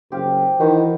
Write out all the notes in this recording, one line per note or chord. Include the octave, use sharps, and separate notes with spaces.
F#1 G4 C5 F5
D#3 E3 F#4 B4 C5